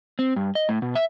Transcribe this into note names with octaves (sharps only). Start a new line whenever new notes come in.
C4
G2
D#5
A2
B2
E5